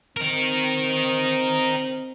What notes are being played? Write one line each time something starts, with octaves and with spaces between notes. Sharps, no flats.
C4 D#4 A#4